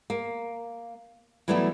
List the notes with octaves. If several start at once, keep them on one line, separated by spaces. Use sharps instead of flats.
A#3
E3 F#3 G3 A3 B3 E4